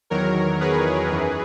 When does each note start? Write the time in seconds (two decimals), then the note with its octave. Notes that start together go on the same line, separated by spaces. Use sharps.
0.10 E2 D#3 F#3 A#4 C#5
0.61 G#4 B4
1.11 F#2 E3